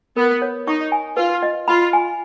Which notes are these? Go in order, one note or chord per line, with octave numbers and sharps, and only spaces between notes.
B3 A#4
C#5
D#4 C#6
G#5
F4 B4
D#5
F4 B5
G#5